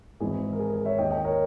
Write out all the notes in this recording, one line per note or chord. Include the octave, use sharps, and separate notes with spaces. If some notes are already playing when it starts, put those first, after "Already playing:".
G#1 G#2 E3 G#4
A#4
G#4
G#4
C#5 E5
D#2 D#3 D#5 G5
D#5 G5
A#4 C#5